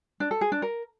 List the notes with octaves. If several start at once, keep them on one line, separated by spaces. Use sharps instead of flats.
D4
A4
G#4
D4
A#4